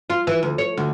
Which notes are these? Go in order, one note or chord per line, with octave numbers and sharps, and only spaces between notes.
F4
E3
D2
C#5
D2